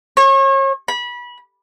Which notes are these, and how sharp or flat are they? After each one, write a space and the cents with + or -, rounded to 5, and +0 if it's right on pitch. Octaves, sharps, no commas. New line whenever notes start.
C#5 -35
B5 -25